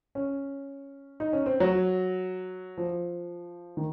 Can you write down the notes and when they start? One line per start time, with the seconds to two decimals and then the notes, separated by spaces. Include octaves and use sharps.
0.15 C#4
1.20 D#4
1.33 C#4
1.46 C4
1.60 F#3
2.77 F3
3.77 D#3